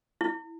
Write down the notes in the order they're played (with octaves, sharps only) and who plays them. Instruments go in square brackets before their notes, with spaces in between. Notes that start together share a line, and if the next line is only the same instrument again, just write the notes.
[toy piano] E4